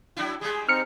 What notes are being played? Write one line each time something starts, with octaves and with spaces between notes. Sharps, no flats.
F#3 D4 E4
G3 G#3 G#4
C4 D#4 F6 C#7